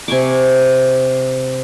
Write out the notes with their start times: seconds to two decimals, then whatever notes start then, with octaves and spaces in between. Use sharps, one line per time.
0.08 C3 G#5 C#6 D6